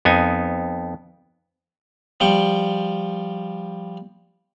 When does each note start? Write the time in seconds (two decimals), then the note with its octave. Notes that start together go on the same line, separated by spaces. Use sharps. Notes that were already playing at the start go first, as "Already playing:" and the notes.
0.05 F2 B3 D#4 G#5
2.20 F3 G3 G5 C#6